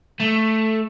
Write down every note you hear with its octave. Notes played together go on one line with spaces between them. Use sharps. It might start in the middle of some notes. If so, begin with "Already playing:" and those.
A3